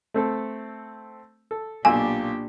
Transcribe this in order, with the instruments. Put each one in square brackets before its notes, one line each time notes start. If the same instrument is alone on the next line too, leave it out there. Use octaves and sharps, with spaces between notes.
[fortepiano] A3 C4 A4
A4
[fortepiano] B1 F4 E6 [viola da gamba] A#2 D4 G4 [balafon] G#5